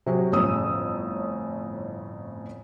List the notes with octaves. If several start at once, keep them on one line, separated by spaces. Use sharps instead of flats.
C3 F#3 G#4
G1 F2 A2 C#4 D#6 E6